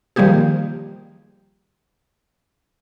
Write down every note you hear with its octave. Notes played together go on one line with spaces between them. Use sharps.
D#3 F3 G3 A#3 G4 G#4